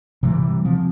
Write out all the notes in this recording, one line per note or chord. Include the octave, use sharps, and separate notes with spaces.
C3 E3 G3
F3 C4